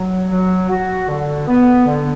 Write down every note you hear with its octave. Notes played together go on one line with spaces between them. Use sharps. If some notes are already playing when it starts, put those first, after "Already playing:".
Already playing: F#3
F#3
F#4
D3
B3
D3